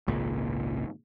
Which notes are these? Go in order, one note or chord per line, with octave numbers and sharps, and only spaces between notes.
G#1 C#2 A#2